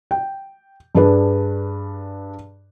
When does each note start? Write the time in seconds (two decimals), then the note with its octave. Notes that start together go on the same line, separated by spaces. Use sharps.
0.11 G5
0.95 G2 D4 G#4 B4